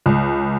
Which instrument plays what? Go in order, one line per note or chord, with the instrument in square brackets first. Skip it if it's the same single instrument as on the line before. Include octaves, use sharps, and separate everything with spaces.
[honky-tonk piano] C#2